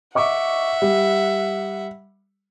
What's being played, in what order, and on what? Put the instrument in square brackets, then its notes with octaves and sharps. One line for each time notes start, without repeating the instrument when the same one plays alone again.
[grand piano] D#5 C#6 D6 [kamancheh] E5 F#5
[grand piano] G3